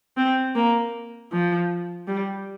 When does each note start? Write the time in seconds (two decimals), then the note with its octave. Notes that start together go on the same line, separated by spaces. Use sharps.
0.17 C4
0.55 A#3
1.32 F3
2.08 G3